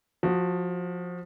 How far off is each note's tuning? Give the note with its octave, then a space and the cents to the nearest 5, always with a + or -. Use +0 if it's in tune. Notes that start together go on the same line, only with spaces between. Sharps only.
F3 +20 F#4 +0